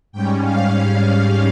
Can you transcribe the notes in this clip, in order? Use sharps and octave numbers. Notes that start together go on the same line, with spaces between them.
G#2 G3 C#4 G5
F5
F5